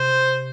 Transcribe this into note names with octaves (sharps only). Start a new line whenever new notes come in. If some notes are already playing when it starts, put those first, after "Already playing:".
Already playing: C3 C5